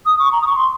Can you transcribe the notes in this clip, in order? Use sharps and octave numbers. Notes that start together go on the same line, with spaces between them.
D#6
C#6
A#5
D#6
C#6
C6